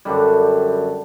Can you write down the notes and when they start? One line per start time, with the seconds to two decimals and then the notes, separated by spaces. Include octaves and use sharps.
0.05 F#2 D3 G3